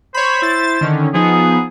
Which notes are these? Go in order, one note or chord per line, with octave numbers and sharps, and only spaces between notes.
C5 C#5 B5
E4 A6
D3 D#3 C#4
F3 B3 D#4 G#4